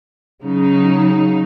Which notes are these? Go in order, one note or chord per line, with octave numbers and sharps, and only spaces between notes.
C#3 F#3 D#4